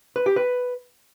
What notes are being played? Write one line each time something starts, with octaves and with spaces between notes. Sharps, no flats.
B4
G4
B4